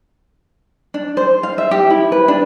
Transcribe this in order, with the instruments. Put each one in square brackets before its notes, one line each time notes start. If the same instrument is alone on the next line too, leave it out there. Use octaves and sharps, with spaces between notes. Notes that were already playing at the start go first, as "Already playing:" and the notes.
[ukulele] D4
C5
F5
E5
G4
E4
B4
D4